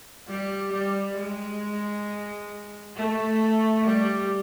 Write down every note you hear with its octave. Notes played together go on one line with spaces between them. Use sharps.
G3
G3
G#3
A3
G3